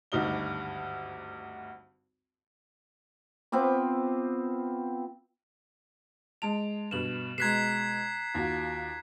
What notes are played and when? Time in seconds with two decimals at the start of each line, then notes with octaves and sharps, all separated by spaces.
0.12 G#1 D2 G2 D#4 G7
3.52 B3 C4 F4 D6
6.42 G#3 A5 D7 F7
6.91 G2 B2 E7 F#7
7.38 B2 G#3 A#5 F#6 G#6 B6 C7 E7
8.34 D#2 F4 F#4